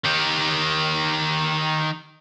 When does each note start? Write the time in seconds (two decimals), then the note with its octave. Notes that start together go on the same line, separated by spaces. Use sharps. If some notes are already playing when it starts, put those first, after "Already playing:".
0.04 D#3 G4